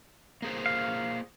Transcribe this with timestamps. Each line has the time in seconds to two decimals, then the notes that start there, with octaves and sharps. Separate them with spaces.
0.42 A#3 G#4 C5
0.66 F5